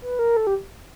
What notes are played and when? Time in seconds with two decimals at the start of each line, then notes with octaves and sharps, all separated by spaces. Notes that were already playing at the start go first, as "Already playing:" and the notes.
0.02 B4
0.19 A#4
0.37 A4
0.47 G4